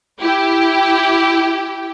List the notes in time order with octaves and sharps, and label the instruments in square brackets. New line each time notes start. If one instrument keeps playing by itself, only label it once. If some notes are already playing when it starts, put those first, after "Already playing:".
[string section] E4 G4 G5